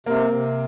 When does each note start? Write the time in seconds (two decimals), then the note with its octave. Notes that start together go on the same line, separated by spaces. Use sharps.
0.06 C3 A#3
0.33 C3